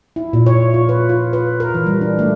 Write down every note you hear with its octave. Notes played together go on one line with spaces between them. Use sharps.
E4
A#2
C#5
F4
B4
F4
B4
A#4
E3
G3
D4
A3